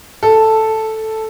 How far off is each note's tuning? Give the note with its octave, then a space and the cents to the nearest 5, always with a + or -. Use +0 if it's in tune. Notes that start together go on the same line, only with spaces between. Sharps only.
A4 +0